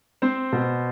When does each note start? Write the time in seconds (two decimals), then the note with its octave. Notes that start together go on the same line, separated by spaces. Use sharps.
0.22 C4 C5
0.52 B2